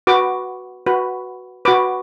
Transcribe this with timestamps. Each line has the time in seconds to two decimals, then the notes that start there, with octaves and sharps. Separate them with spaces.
0.07 F#4 B4 D6
0.86 F#4 B4
1.65 F#4 B4 D6